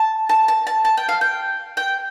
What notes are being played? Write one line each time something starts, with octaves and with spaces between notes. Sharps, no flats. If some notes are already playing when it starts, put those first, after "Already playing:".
Already playing: A5
A5
A5
A5
A5
G5
F5
G5
G5